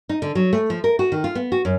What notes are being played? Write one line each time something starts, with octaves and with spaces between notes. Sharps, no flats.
D#4
D3
F#3
A3
F3
A#4
F#4
D#3
F4
B3
F#4
F#2